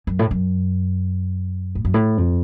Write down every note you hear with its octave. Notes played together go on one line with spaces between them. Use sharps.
F#2
A2
F#2
A2
F#2
A2
F2